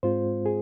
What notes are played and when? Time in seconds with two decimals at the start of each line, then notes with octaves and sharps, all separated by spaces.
0.03 G#2 G#3 C4 F4 C5
0.46 G#4